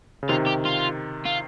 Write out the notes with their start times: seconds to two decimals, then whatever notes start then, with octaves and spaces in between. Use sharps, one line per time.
0.23 C#3
0.29 C3 D#3 F4
0.46 G4
0.65 F4
1.26 F4